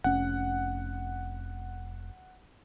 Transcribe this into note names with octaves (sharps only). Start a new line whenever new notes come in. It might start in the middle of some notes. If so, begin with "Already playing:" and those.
F1 C#4 F#5